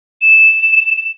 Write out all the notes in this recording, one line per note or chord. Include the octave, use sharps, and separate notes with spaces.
E7